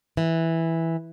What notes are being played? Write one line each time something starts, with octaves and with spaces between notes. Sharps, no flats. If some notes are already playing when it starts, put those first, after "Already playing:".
E3